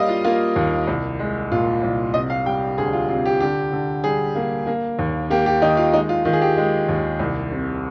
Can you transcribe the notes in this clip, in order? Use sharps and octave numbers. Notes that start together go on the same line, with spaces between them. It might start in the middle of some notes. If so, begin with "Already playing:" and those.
Already playing: G3 A#3 D#5 F5
F4
A#3 F4
D#2
C2
G#3
A#2 F4
C2
C3 D#5
F5
G3 G5
D2 G#4
F4
C3 F4
G4
D3 G4
D3
G3 G#4
A#3
A#3
D#2
A#3 G4
G4
D#3 D#4
F4
G#3 D#4
F4
D#3 F4
G#4
G4
G#3
D#2
C2
C3